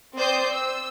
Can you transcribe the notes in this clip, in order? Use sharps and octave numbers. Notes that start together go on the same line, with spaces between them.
C4 C5 D5 D#6 G6
E6